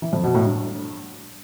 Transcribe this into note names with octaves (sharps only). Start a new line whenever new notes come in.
E3
F2
B2
A2
G2